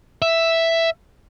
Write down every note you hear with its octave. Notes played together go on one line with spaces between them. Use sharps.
E5